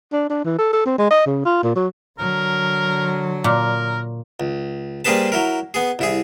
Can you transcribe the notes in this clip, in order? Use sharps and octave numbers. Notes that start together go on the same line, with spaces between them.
D4
D4
E3
A4
A4
C4
G#3
D#5
C#3
F4
A#2
F#3
D3 F#3 A#4
A#2 A#4
C#2
G3 A#3 C4 G#4 B4 A5
F#3 E4 A#4
B3 G#4
C2 E4 G#4